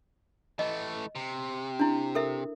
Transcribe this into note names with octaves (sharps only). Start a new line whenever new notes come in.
E3 A3 D#5
C3
D4 E4
A4 A#4 E5